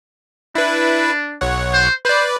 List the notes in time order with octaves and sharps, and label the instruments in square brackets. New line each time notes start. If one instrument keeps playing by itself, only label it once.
[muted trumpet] D4 [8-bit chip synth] E4 B4
[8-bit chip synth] B1 C#5 F#5
[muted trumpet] C5
[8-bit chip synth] B4 D5 [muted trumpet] C5